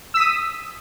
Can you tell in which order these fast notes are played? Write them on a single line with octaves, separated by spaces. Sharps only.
E6 B6 D#6